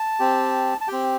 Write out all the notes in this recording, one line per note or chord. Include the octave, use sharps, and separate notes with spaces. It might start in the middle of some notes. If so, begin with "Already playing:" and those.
Already playing: A5
C4 G4
A5
C4 G4 G5